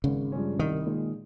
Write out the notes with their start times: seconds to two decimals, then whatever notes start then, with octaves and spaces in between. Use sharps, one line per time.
0.04 G#1 C#3
0.32 G2 F3 G#3 C#4
0.59 C2 D#3
0.86 A#2 G#3 D#4 G#4